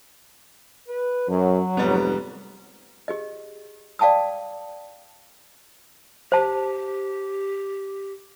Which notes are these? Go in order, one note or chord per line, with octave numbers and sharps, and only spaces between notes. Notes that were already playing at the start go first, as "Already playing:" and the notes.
B4
F#2 F#3
F1 G#2 G3 B3
G4 G#4 D#5
D5 F5 G5 A5 D6 D#6
G4 C5 A5